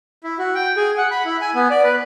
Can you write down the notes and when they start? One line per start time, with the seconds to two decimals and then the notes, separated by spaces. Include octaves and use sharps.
0.24 E4
0.39 F#4
0.55 G5
0.77 G#4
0.97 F#5
1.11 B5
1.25 E4
1.41 G#5
1.55 B3
1.70 D5
1.83 B4